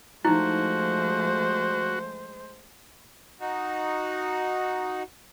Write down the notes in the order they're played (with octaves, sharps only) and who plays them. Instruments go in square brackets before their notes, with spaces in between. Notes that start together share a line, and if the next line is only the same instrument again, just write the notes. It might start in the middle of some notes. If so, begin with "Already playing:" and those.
[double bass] F3 A3 [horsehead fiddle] G#3 C5 [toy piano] D#4 E4 [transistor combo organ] F#4
[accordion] D#4 F#4